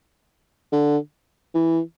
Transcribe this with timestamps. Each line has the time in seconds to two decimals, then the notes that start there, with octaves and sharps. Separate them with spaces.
0.72 D3
1.54 E3